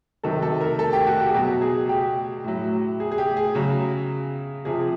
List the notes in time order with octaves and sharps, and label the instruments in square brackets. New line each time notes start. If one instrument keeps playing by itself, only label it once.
[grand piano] C3 D#3 F#3 A4
A4
A#4
A4
G4
F#4
G4
G#4
B2 F#3 G4
G#4
G4
A2 F#3
G#4
G#4
G4
G#4
C#3 F#3
C3 F3 G#4